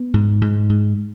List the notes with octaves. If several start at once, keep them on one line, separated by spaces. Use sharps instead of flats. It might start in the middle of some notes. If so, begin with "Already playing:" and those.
Already playing: B3
G#2
G#2
G#2